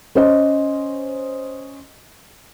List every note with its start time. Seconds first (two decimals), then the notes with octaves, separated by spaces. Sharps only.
0.15 C#4 C5 D#5